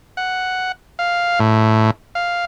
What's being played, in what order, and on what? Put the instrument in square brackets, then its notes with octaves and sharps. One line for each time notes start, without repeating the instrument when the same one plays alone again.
[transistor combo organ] F#5
F5
A2
F5